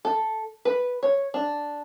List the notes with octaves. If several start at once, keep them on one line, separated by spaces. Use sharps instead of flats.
A4
B4
C#5
D4